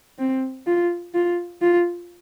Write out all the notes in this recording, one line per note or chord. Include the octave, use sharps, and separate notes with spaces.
C4
F4
F4
F4